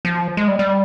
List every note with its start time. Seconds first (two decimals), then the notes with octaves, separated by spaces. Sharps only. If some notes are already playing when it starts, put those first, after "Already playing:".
0.05 F3
0.37 G#3
0.48 G3
0.59 G3